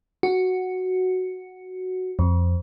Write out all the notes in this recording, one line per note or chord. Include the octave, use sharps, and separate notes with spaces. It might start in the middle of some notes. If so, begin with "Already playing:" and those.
F#4
F2